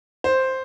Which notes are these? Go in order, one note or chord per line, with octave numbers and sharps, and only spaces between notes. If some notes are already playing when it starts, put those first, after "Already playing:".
C5